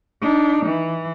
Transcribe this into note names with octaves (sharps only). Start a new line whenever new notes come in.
D4 D#4
E3